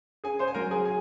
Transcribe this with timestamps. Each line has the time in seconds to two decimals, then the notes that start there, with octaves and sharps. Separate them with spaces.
0.24 C#4 G#4 G#5
0.39 C5 C6
0.48 G#5
0.54 F#3 A#4 A#5
0.71 G#4 G#5
0.85 G#4 G#5